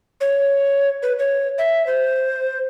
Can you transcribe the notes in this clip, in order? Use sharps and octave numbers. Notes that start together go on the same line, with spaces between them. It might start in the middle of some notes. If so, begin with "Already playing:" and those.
C#5
B4
C#5
E5
C5